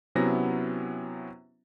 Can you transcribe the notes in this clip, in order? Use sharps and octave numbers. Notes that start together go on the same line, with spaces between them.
C3 F#3 B3 C#4 E4 A#6